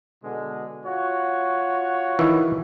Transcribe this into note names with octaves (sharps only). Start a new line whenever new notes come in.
B2 D3 G#3
F4 F#4 C#5
D#3 E3